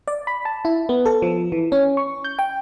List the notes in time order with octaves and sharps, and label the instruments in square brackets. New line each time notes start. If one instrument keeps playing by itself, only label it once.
[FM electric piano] D5
B5
A5
E4
B3
A4
F3
E3
C#4
C#6
G6
G5